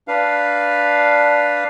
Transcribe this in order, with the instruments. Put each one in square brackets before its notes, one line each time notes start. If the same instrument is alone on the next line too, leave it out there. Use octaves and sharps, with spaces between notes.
[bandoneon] D4 B4 F5